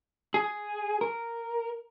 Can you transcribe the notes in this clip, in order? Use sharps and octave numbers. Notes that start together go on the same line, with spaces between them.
G#4
A#4